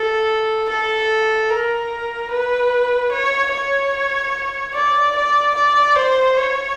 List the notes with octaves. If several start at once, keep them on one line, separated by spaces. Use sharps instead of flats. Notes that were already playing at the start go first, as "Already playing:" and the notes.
Already playing: A4
A4
A#4
B4
C#5
C#5
D5
D5
D5
C5
C#5